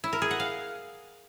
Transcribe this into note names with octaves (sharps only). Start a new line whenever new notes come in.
E4
A#4
G#4
F#5
F5